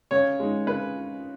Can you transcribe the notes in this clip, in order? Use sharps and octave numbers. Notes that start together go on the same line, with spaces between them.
C#3 C#5
G#3 D#4
C#3 B4